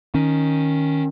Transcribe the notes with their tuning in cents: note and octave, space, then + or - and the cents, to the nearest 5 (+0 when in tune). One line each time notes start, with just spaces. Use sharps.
D#3 +0 C#4 +0